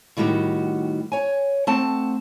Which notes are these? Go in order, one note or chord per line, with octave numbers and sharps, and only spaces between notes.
A2 D#3 G3 F#4 G4 F#5
C#5 G#5
A3 C4 F#5 A5